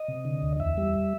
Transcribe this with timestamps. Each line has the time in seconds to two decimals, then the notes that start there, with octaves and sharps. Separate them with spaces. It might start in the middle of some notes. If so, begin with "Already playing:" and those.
Already playing: D#5
0.08 C3
0.25 D3
0.42 D2
0.60 E2 E5
0.77 G3